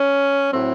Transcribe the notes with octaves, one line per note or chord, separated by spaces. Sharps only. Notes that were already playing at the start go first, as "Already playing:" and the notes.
Already playing: C#4
A2 F#3 A3 C4